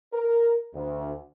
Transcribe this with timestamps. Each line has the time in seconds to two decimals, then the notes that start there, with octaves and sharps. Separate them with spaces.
0.13 A#4
0.74 D2